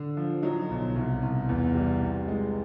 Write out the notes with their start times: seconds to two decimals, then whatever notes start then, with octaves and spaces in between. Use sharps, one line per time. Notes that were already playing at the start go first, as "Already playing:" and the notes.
Already playing: D3
0.17 F3
0.42 F#3 D#4
0.70 B1
0.96 C2
1.22 C2
1.48 E2 E4
1.75 G3
2.02 C3
2.28 G#3